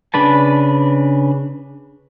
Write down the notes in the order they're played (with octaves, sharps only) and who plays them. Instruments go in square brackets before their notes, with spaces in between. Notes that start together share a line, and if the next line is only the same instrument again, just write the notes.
[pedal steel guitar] C#3 D4 B4 A5